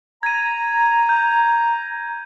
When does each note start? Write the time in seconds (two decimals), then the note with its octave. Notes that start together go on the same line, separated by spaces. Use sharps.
0.23 A#5 G#6 D#7
1.09 G6